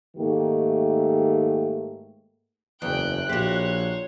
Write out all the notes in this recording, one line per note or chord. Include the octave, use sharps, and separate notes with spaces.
G#2 D#3 A3 A#3 G4
F#1 E2 G5 F#6
A#1 F#4 G4 C5 C#5